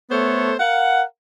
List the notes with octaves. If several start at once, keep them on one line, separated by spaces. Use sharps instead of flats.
A3 B3 A4 C5 C#5
A#4 F5 F#5